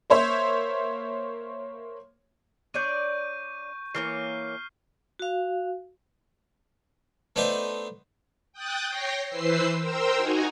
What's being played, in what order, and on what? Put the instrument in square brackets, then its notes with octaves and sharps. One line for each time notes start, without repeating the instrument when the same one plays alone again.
[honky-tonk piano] A#3 C5 C#5 E5
[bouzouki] D4 C#5 D5 [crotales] C#6 G6 D#7
[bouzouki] E3 A#3 C#5 [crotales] F6 G6 C7
[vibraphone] F#4 F5
[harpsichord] A3 B3 D4 D#4 B4 C5
[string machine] G5 D#6 F#6 G6 A6
C#5 G5 A#6 C7
E3 B4 C5 E6 C7
A#4 C5 G5 C6 E6
D#4 F#4 G#5 A#5